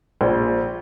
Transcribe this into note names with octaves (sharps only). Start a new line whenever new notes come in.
A#1